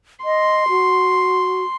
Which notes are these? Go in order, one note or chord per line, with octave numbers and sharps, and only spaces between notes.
D#5 C6
F#4